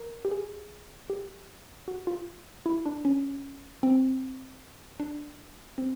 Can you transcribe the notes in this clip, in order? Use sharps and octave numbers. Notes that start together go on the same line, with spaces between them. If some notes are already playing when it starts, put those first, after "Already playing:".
Already playing: A#4
G4
G#4
G4
F#4
F4
E4
D4
C#4
C4
D4
C4